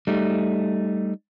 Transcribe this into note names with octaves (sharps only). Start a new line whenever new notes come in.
G3 A3 D#4